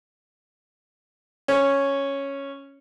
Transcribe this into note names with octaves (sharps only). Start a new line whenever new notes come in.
C#4